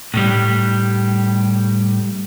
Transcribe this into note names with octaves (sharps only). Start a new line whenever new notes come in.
A2 G3